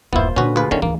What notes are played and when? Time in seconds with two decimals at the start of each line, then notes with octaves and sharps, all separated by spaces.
0.13 D#1 G2 A#3 B3 E4 F4 C5
0.36 A#2 D3 C#4 F#4 B4
0.56 D2 F4 G#4 B4
0.71 D3 D#3 B3 C#4
0.82 D2 E3 A#3